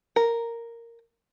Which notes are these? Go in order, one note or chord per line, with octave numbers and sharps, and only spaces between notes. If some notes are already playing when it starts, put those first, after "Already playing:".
A#4